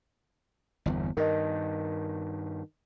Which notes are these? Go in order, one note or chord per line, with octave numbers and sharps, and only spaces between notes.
G1 E2
G2 D#3 A#4 D#5